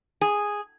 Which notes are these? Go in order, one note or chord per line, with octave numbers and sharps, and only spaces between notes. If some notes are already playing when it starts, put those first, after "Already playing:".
G#4